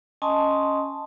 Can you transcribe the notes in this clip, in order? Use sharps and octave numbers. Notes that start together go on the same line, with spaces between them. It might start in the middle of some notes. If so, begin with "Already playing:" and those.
C#4 D#5 G#5 A5 C6 D#6